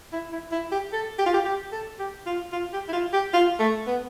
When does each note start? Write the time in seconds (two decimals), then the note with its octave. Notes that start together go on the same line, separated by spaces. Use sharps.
0.13 E4
0.32 E4
0.52 E4
0.72 G4
0.93 A4
1.19 G4
1.26 F4
1.34 G4
1.46 G4
1.72 A4
1.99 G4
2.26 F4
2.53 F4
2.73 G4
2.89 E4
2.93 F4
3.14 G4
3.34 F4
3.60 A3
3.87 B3